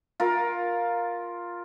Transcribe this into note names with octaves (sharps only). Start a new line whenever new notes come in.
F4 A#4